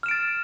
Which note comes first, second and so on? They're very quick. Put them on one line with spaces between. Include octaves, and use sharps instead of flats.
F6 E7 D7 A6